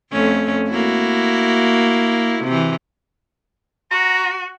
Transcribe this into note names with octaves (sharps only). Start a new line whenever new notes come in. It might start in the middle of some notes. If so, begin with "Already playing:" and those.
F2 A3 C#4
A#3 E4 F#4
C3 E3
F#4 A#5